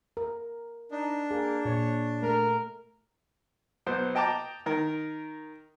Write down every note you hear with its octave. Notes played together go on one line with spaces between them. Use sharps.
A#4
D4 D#4
A#3 G#4
A#2 C#5
A3 A#4
B1 B3 C5
D#5 G5 A5 A#5 D6
D#3 A#4